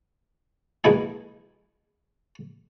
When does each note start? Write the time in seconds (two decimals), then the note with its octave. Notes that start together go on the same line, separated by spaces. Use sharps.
0.84 A#1 B2 G#3 E4 G#4